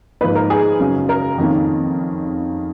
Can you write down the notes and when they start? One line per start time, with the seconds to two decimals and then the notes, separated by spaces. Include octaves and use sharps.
0.21 G#2 F3 A#3 D#4 B4
0.35 A#4
0.50 G#4
0.80 F#2 C#3 F#3 C#4
1.09 A#4
1.38 F2 D#3 A#3 C#4